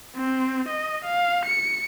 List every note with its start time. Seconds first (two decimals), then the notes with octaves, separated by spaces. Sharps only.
0.16 C4
0.68 D#5
1.04 F5
1.45 C#7